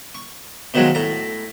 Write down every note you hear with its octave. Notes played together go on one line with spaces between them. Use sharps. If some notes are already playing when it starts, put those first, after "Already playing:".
C#6
B2 D#3 F3 F#3 G#3
A2 A#5